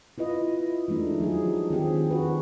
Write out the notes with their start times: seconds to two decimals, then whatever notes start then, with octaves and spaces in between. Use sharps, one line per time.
0.18 E4 F4 B4 D#5
0.88 E3 G#3 A3 D4 D#4
1.20 F3 F#3 F4 G#4
1.70 D#3 C4 G4 G#4
2.10 F#4 B4